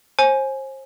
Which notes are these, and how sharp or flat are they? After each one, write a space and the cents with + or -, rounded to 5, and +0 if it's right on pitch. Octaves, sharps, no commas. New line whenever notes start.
C5 +35 G#5 +10